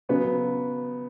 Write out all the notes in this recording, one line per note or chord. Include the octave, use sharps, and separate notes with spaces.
C#3 F#3 B3